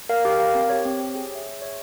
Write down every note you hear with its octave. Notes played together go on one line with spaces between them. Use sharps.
A#4 F5
G4
A#4 F5
C4
G4 C#5
C4
G4 C#5
G#4
C#5 E5
G#4
C#5 E5